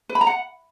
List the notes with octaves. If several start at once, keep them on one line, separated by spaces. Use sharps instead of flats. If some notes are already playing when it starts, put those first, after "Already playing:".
B4
B5
A#5
F#5